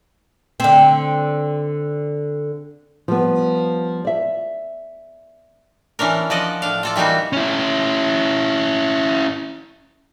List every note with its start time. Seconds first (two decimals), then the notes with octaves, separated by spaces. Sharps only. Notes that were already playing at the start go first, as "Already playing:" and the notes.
0.60 D3 C4
3.08 F3 G3 B3
4.05 D5 E5
5.99 E3 C#4 D4 A#4
6.30 F3 D5 D#5 F#5
6.62 A2 D4 F5
6.83 F4 A4 D5
6.96 E3 G3 A#3 D#4 F#4
7.33 C#4 E4